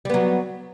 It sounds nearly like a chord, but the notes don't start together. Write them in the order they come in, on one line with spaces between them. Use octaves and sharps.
G3 B3 F#3